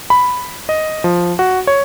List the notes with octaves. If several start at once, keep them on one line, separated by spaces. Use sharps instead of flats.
B5
D#5
F3
F#4
C#5